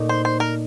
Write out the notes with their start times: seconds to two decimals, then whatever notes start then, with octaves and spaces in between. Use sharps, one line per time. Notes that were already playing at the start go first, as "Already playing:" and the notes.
Already playing: A#2 A3 D#4
0.09 C5
0.25 C5
0.40 A#4